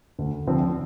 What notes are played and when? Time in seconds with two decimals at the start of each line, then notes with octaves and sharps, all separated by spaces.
0.19 D2
0.47 D3 F3 C4